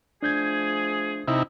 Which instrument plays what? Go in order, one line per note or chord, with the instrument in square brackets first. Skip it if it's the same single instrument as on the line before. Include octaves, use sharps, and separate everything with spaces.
[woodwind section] F3 A3 G#4 [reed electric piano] D4 G6 G#6
[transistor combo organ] C3 D#4 E4